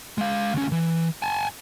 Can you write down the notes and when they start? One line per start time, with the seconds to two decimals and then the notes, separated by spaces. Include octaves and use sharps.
0.18 G#3 F5
0.54 D2 C#4
0.72 E3
1.22 G#5 A5